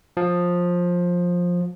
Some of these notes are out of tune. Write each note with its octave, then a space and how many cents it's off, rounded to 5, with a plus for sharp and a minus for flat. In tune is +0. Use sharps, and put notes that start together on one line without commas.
F3 +15